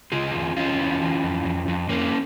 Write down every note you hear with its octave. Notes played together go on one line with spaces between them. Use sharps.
C#3 F4 G#4
E2
E2 C#4 F4
E3
E3
F2
F2
F2
F2 A#3 C#4